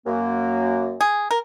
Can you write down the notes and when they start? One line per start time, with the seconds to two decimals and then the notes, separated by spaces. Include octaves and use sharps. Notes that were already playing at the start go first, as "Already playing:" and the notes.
0.06 F#2 A#3
1.01 G#4
1.31 A#4